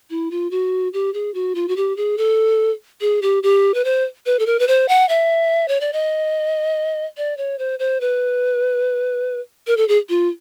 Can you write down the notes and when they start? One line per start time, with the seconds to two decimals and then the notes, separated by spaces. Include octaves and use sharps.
0.10 E4
0.31 F4
0.51 F#4
0.93 G4
1.14 G#4
1.34 F#4
1.55 F4
1.68 F#4
1.77 G4
1.97 G#4
2.18 A4
3.01 G#4
3.22 G4
3.43 G4
3.74 B4
3.85 C5
4.26 B4
4.39 A4
4.46 A#4
4.59 B4
4.68 C5
4.89 F#5
5.09 E5
5.68 C#5
5.81 D5
5.93 D#5
7.17 D5
7.37 C#5
7.59 C5
7.79 C5
8.01 B4
9.67 A#4
9.77 A4
9.88 G#4
10.09 F4